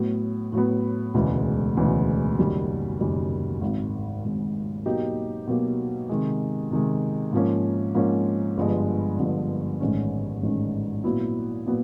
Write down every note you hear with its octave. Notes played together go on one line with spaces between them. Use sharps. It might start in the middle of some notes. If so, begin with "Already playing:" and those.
Already playing: A2 F#3 B3
A2 F#3 B3
E1 D2 C#3 E3 G#3
E1 D2 C#3 E3 G#3
F#1 F#2 D#3 G3
F#1 F#2 D#3 G3
G#1 G#2 D#3
G#1 G#2 D#3
B2 F#3 A#3 D#4 G4
B2 F#3 A#3 D#4 G4
C3 D#3 G#3
C3 D#3 G#3
G#2 F3 A#3 C#4
G#2 F3 A#3 C#4
G1 G2 D3 F3 G#3
G1 G2 D3 F3 G#3
A1 G#2 D#3 G#3 C#4
A1 G#2 D#3 G#3 C#4
A#2 F#3 B3 E4
A#2 F#3 B3